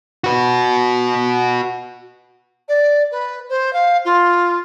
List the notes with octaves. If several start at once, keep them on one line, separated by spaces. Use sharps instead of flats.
F#4 B4
D5
B4
C5
F5
F4